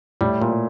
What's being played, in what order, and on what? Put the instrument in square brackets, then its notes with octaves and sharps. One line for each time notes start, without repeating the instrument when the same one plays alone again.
[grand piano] A2 [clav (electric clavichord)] G3
[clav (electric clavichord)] A#2